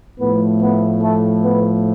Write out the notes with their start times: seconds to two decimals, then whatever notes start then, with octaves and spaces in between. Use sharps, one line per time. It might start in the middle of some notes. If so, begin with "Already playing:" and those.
0.19 A2 F3 A3 B3 B4
0.60 B3 B4
1.02 A3 A4
1.43 B3 B4